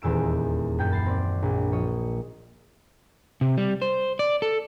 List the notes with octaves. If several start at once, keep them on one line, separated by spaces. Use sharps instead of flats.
D#1 E2 A#2 E6 D7
F#2 G5 G6
B5 A6 C7
C4 D5
A#1
F3 C#5 D#5
C3
G3
C5
D5
A4